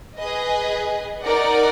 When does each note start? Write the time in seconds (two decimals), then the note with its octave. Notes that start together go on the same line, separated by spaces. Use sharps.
0.17 G#4 B4 D#5
1.22 D#4 A#4 D5 F#5